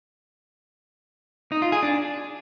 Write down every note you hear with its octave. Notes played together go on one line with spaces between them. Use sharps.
D#4
F4
G#4
D4